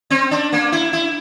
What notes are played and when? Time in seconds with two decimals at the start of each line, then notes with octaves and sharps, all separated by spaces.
0.10 C4
0.31 D4
0.53 A#3
0.72 E4
0.93 E4